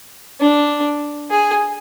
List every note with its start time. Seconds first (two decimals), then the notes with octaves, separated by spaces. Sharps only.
0.40 D4
1.31 G#4